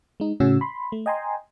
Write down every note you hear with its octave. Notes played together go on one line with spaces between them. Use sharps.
G#3 D#4
A2 C#3 C#4 F#4 E6
B5 C6
A3
D#5 G5 G#5 A#5 C6